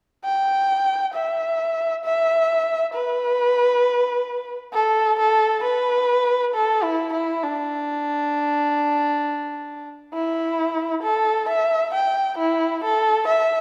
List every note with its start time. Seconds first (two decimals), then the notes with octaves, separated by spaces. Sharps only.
0.24 G5
1.14 E5
2.05 E5
2.94 B4
4.73 A4
5.19 A4
5.64 B4
6.54 A4
6.83 E4
7.13 E4
7.43 D4
10.13 E4
11.03 A4
11.49 E5
11.94 G5
12.38 E4
12.84 A4
13.28 E5